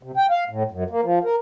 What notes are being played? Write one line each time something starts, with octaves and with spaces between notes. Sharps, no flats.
C3
G5
F5
A2
F#2
A#3
F3
A#4